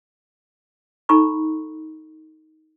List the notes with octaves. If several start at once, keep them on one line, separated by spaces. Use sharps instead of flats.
D#4 A4 A#5 B5 C#6